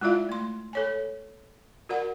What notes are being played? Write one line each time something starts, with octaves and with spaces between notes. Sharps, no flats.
G#3 E4 F4 D5 E5 F5
A3 C6
A4 C#5 G#5
F#4 A#4 D5 F#5